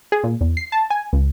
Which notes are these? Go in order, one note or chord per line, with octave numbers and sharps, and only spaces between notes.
G#4
A#2
E2
C7
A5
G#5
C#2